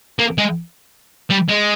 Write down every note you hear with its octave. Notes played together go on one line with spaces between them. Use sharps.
A#3
G#3
G3
G#3